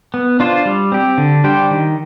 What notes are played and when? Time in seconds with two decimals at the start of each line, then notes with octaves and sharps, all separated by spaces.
0.14 B3
0.40 D4 F4 C5
0.66 G3
0.92 C4 G4
1.18 D3
1.44 G3 D4 G4 C5
1.71 D#3